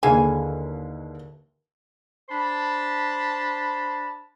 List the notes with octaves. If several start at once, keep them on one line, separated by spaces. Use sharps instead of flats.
D#2 D3 E3 G#4 F5 G#5
D4 C5 A5 B5